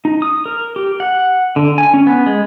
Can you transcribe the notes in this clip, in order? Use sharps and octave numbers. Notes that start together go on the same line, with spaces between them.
D#4
D#6
A#4
G4
F#5
D3
G#5
C#4
B3
G#3